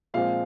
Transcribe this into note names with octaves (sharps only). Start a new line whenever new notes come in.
A#2 F3 G#3 C4 F5